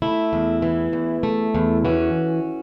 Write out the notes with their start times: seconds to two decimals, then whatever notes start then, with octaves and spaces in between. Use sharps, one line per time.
0.02 A3 E4
0.33 E2
0.62 E3
0.93 E2
1.23 A3
1.55 E2
1.85 E3 C#4 F#4